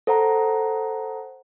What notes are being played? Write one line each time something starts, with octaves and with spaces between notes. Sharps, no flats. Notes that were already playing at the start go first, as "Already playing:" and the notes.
A4 C5 F#5 A#5